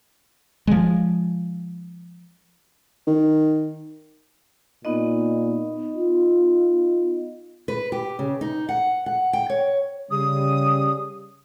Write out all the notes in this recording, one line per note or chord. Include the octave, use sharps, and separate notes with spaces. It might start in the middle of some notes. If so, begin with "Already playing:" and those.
F3 G#3
D#3
A#2 B3 D#4 D#5
F4
B4
G4
C#3
D#4
F#5
F#5
G5
C#5
C#3 G3 D#6